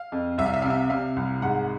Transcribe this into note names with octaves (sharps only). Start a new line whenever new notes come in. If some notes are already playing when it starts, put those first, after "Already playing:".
Already playing: F5
F2
C2 E5
F5
E5
C3 F5
E5
C3 F5
C2
G#2 F#5